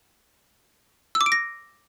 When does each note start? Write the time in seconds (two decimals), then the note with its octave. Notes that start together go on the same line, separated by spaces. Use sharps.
1.15 E6
1.21 D6
1.26 D7
1.32 A#6